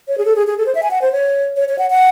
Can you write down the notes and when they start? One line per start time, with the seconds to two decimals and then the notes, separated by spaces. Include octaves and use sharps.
0.08 C#5
0.18 G#4
0.25 A4
0.36 G#4
0.47 G#4
0.58 A4
0.66 C5
0.75 E5
0.83 G#5
0.91 F#5
1.02 C5
1.12 C#5
1.57 C#5
1.69 C#5
1.79 F#5
1.91 F#5